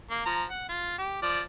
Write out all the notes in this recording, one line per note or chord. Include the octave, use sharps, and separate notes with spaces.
A#3
F3 A#5
F#5
F4
G4
F3 D5